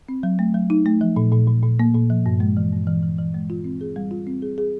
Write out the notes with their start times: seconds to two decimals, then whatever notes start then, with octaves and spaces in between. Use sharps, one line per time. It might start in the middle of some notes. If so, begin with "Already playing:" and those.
0.09 C4
0.23 F#3
0.39 A3
0.54 F#3
0.70 D#4
0.86 A3
1.01 F3
1.16 A#2
1.32 A#2
1.48 A#2
1.63 A#2
1.79 A#3
1.94 A#2
2.10 F3
2.26 G2
2.40 G#3
2.57 E3
2.72 G2
2.87 E3
3.03 E3
3.19 E3
3.34 G#3
3.50 F4
3.64 C4
3.81 G#4
3.96 G3
4.11 F4
4.27 C4
4.42 G#4
4.58 G#4